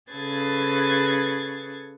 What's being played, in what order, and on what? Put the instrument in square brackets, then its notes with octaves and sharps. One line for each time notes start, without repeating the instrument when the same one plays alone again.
[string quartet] C#3 G#4 A4 B4 G#6 A6